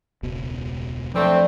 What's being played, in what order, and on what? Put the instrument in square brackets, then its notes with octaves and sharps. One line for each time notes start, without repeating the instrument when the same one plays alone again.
[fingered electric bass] E1 C#2 B2
[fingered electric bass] F3 F#3 [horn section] A3 C4 [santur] D4 B4 D5